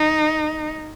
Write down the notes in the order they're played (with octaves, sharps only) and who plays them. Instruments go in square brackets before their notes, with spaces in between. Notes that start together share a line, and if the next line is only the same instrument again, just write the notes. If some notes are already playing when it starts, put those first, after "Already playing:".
Already playing: [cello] D#4